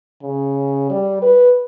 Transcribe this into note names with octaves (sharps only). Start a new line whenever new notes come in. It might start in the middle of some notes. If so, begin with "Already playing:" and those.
C#3
G3
B4